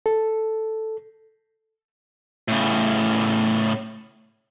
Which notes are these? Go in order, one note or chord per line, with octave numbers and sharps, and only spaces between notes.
A4
A2 C#3